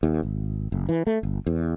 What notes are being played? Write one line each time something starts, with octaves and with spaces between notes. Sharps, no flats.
D#2
G#1
F#1
E3
A3
G1
E2